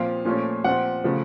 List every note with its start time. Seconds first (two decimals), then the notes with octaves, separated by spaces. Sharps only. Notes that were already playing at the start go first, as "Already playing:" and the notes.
Already playing: A#2 F3 C4 F5
0.25 A#2 F3 A3 C#4
0.64 A#2 F3 C4 F#5
1.04 C#3 F3 A3